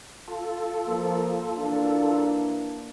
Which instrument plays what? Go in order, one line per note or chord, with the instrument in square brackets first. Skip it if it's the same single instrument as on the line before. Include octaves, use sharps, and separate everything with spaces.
[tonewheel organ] F4 A4
[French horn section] F3 A#3
E3 A#3 D4